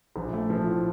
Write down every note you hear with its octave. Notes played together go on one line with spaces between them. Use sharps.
A#1
A3
F3
A2